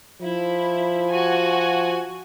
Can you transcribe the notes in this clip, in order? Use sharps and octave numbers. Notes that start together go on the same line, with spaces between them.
F3 E4
F#4 G#5